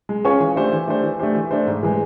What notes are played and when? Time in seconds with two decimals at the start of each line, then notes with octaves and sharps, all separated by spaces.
0.09 G#3
0.25 C#4 F4 G#4 C#5
0.40 E3
0.56 A3 D4 G4 C5
0.73 E3
0.88 A3 D4 G4 C5
1.04 E3
1.19 A3 D4 G4 C5
1.35 E3
1.51 A3 D4 G4 C5
1.67 G#2
1.83 E3 G#3